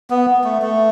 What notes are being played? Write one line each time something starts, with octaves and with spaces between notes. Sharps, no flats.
B3
A3
A3